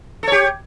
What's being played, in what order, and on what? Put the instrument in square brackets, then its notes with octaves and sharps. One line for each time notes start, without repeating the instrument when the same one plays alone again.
[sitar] A4
C#5
G4